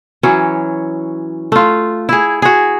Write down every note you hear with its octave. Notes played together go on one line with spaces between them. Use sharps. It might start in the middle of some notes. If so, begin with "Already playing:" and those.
E3 F#3 C#4
A3 F4
E4 G#4
F#4 G#4